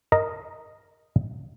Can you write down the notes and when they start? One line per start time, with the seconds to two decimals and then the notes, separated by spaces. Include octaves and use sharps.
0.12 A#4 D#5 A#5